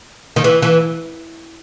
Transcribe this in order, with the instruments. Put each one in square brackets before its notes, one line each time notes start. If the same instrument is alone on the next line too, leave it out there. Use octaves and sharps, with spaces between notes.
[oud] D#3
E3
E3